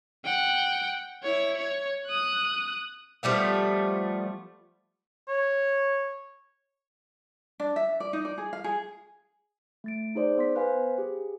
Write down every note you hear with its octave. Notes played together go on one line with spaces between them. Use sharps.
F#5 G5
E4 C#5
C#5
D#6 F#6
F3 G3 A3 B3
C#5
D4
E5
D5
D#4
D5
G#4
F5
G#4
A3 A6 D7
D#4 G#4 C5 D5
B3 C6 B6
B4 C5 F5 G#5
G4 G#4